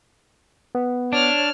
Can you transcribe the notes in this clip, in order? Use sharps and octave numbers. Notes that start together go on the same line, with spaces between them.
B3
D4 C#5 F6